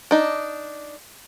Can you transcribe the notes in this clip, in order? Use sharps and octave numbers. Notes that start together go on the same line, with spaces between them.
D4 D#4